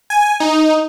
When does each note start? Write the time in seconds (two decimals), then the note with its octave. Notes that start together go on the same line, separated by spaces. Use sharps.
0.10 G#5
0.40 D#4